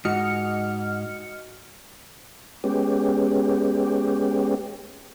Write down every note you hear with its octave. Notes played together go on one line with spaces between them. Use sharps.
G#2 F#4 D#5 F6 C#7
G#3 B3 C#4 G4